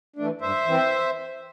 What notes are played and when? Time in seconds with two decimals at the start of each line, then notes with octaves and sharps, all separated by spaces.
0.16 E3 A3 D4
0.41 G2 C5 E5
0.66 E3 C4